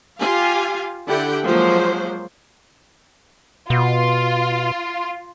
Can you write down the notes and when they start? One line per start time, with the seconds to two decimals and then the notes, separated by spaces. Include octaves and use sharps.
0.19 F4 G4 F5 G#5
1.06 D3 E4 G4 F#5 G5
1.44 F3 F#3 G#3 A#3 C5
3.70 B2 F4